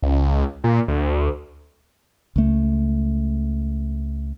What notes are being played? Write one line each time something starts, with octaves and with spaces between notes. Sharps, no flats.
C#2
A#2
D2
C#2 A3